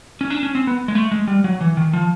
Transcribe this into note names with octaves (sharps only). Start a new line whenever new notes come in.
C#4
D4
C#4
C4
B3
G#3
A3
G#3
G3
F#3
E3
D#3
F3